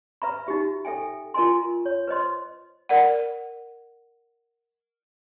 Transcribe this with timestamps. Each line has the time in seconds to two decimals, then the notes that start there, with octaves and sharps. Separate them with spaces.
0.22 B4 E5 A#5 B5
0.47 D#4 F#4 G4 E5
0.85 A4 E5 G5 G#5
1.34 F4 A#4 D#5 G#5 C6
1.86 C#5
2.07 B4 C5 D#5 C6
2.89 A#4 D5 F#5